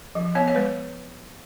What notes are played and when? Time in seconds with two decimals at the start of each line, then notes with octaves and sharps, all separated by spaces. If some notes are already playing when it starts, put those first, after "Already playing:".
0.15 F3
0.35 B3 C#5
0.48 C#5
0.55 G#3 B4